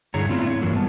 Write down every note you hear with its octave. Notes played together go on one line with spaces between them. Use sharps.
G2 D3 E4 G#4 C#5 A#5
A2 B3 C4 D4 E4 F4
C#5
G2 E3 F#3 A#3
G3 B3 A5